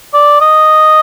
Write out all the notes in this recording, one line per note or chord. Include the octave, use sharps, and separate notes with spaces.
D5
D#5